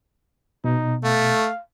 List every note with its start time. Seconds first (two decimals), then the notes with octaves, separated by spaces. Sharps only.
0.64 B2 D#4
1.04 A3 F5